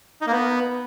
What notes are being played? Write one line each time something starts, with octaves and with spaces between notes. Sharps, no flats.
D#4
A#3
B3